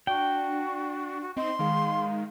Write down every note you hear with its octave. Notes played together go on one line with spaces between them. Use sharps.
D4 F#4 G5
F#4
C4 D#4 D#5 C6
D#3 G#3 F5